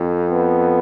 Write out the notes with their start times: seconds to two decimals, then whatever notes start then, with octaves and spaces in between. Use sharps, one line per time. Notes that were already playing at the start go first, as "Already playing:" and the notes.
Already playing: F2
0.29 B3